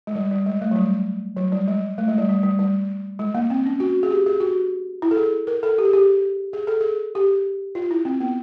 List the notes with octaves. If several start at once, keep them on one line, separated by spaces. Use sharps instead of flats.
G#3
G3
G3
G#3
A3
F#3
G3
F#3
G3
G#3
A3
G#3
G3
G3
G3
G3
G#3
A#3
C4
C#4
F#4
G#4
G4
G#4
F#4
E4
A4
G#4
A#4
A4
G4
G#4
G4
G#4
A4
G#4
G4
F4
E4
C4
B3